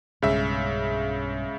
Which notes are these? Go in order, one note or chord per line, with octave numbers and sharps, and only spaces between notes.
B1 G2 C#3 G#3 E5